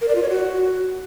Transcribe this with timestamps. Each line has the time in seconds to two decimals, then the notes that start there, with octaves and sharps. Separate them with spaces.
0.01 A#4
0.08 D5
0.15 F4
0.22 C#5
0.29 F#4